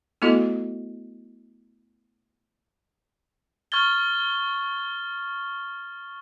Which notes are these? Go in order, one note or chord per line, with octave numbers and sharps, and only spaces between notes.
A3 B3 E4 F#4 A4 D#5
C#6 F6 G#6 A6 G7